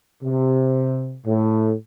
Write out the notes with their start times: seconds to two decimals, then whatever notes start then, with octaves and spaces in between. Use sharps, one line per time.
0.23 C3
1.26 A2